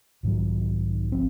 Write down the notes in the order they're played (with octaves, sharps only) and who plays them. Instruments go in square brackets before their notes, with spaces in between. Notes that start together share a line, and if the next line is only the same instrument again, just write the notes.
[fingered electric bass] B1 G#2 D#3 F#3
G#1 F3 B3 C4